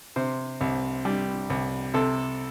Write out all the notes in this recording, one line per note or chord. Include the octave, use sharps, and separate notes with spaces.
C3 C5
C2
G3
C2
C3 A4